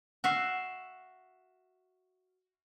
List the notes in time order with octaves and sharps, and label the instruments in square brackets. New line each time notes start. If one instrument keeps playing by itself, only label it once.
[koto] F#4 E5 F5